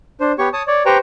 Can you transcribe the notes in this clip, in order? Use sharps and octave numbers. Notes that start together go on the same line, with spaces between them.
D4 C5
B3 G4 C#5 C#6
C#5 A5 D#6
C#5 D5
G4 B4 C5 G5 A#5 C#6